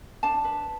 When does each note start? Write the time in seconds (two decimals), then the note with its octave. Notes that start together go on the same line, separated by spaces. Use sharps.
0.23 D4 A5
0.44 B4